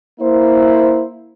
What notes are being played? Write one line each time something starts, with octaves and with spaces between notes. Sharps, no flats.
A#3 E4 C5